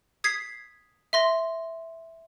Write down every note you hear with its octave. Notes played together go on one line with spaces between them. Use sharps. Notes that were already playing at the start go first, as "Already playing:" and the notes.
D#6 G#6 B6 C7
E5 C6 A#6